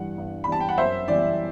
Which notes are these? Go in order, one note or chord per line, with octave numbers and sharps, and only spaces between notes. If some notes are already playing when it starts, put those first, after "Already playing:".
Already playing: G2 E3 G3 F#5
G2
B5
E3 G3 A5
G5
F#5
F#2 C5 E5
E3 G3 D5